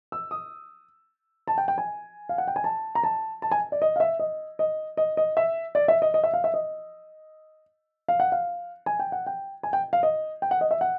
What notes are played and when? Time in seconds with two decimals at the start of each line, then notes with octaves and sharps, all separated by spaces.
0.12 E6
0.31 D#6
1.48 A5
1.58 G5
1.68 G5
1.78 G#5
2.29 F5
2.38 F#5
2.48 G5
2.56 G#5
2.64 A5
2.95 A#5
3.03 A5
3.42 A5
3.51 G#5
3.72 D5
3.82 D#5
3.96 F5
4.00 E5
4.19 D#5
4.59 D#5
4.97 D#5
5.17 D#5
5.37 E5
5.75 D5
5.88 E5
6.02 D#5
6.14 D#5
6.24 E5
6.34 F5
6.44 E5
6.54 D#5
8.08 F5
8.20 F#5
8.32 F5
8.86 G#5
9.00 G5
9.12 F#5
9.27 G5
9.63 G#5
9.73 G5
9.93 F5
10.03 D#5
10.42 G5
10.51 F#5
10.61 D#5
10.71 E5
10.81 F#5